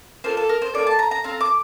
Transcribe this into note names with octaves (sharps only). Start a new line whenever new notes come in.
A#3 F4 A4 C5
A4
A#4
C5
A#3 F4 A4 D5
A5
A#5
A#5
C4 F4 A4 A#5
D6